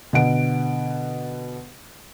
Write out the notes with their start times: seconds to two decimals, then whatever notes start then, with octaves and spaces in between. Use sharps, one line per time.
0.13 B2 D3 F#5 D7